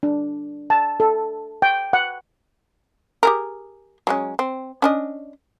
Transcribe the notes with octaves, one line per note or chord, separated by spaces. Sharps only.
D4
A5
A4
G5
F#5
G4 G#4 A#4
F#3 G#3 C#4
C4
C#4 D4 D#5